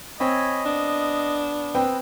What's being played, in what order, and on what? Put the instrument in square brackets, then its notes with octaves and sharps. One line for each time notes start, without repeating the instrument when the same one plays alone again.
[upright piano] C4 [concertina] C#5 G#5 B5 [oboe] D#5
[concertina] B3 [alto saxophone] D4
[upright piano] C4 B4 G5